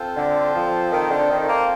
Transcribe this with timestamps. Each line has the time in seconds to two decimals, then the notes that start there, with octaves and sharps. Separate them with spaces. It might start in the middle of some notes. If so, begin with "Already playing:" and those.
Already playing: C4 F4 A4 C5
0.17 D3
0.54 F3
0.92 D#3
1.11 D3
1.29 D#3
1.48 A#3